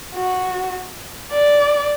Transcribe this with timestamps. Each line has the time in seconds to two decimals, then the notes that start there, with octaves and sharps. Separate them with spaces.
0.15 F#4
1.32 D5